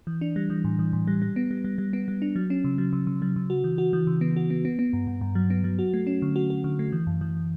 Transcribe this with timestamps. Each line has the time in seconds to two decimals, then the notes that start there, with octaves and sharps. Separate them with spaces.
0.07 E3
0.21 D4
0.36 G3
0.50 E3
0.64 A2
0.79 E3
0.93 A2
1.07 G3
1.22 G3
1.36 B3
1.51 G3
1.64 G3
1.78 G3
1.93 B3
2.08 G3
2.22 D4
2.36 F#3
2.50 C#4
2.64 C#3
2.78 F#3
2.93 C#3
3.07 C#3
3.22 F#3
3.36 C#3
3.50 F#4
3.64 E3
3.78 F#4
3.93 E3
4.07 C#3
4.21 B3
4.36 F#4
4.50 B3
4.65 B3
4.79 B3
4.93 G2
5.07 G2
5.21 G2
5.35 F#3
5.50 B3
5.64 F#3
5.79 F#4
5.94 A3
6.07 C#4
6.22 D3
6.36 F#4
6.50 F#4
6.64 D3
6.79 A3
6.92 E3
7.07 F#2
7.21 E3